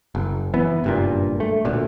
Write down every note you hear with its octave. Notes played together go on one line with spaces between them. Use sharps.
F#1
E3 B3
F#1 G2 A#2
A3
D2 A#2